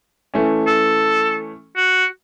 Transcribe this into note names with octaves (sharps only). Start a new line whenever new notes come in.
E3 A3 C#4
A4
F#4